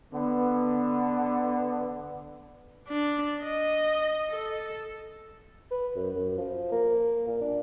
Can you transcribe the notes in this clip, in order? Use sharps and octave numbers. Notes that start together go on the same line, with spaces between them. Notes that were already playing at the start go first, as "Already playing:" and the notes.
D3 B3
D4
D#5
A4
B4
F#2
F#2
F3
A#3
A#2
D4